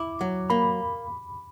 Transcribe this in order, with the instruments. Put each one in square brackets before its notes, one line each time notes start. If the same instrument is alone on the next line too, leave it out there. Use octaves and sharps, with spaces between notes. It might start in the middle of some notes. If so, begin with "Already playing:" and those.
Already playing: [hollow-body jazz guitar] E4 [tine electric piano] D6
[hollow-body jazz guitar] F#3
[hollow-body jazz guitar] A#3 [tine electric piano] B5